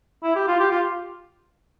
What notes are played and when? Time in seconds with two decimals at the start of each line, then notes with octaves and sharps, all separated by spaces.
0.23 E4
0.36 G4
0.48 F4
0.59 G4
0.71 F4